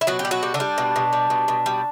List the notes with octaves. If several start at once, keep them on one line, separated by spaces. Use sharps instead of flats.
E4
B2 F#3 F#4
G4
G3
F#3 F#4
G3
D3 D4
G3
B2
B2
G3
B2
B2
G3